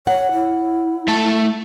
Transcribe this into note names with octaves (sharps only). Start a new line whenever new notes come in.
C#5 F#5
E4
A3 A5